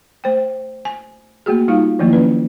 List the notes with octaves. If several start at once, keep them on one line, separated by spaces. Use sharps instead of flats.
A3 C5 G5
G#5
A3 A#3 F#4 G#4
G3 D#4 F4 F5
D#3 F3 F#3 A3 A#3 E4
C#4 B4 D5